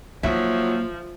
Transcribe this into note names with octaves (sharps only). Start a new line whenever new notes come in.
F3 F#3 A#3 D#4 E5